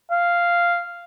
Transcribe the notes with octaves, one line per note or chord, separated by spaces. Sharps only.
F5